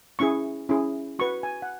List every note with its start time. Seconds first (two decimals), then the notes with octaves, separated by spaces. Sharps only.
0.19 C#4 E4 G#4 C#6
0.69 C#4 E4 G#4
1.19 F#4 B4 C#6
1.43 G#5
1.62 F#5